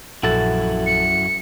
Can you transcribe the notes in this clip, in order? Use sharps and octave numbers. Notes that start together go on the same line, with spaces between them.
A#1 F#2 E4 F#4 A4 A6
C#7